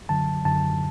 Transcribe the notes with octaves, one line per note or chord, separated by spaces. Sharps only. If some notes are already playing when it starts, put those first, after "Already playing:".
F#2 D3 F#3 A5
F#2 D3 F#3 A5